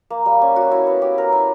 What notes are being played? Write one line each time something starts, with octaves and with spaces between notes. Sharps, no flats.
A#3
G3
C#4
F#4
E4
B3
G4
A#4
E4